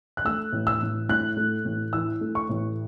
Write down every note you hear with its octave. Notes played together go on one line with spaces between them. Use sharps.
F#6
A3 E6
A1
E6
A1
A2 F#6
A3
A1
E3 E6
A3
C#6
A1